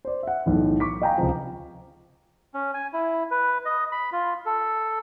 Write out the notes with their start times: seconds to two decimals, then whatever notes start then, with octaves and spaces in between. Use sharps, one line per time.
0.05 C5 D5
0.23 E5 F#5
0.46 B1 E2 A2
0.80 C#6 D6 B6
1.02 D#5 F5 G5 G#5 A#5
1.18 C#2 C3 F3
2.54 C#4
2.74 G#5
2.93 E4
3.31 B4
3.65 D#5
3.92 B5
4.12 F4
4.46 A4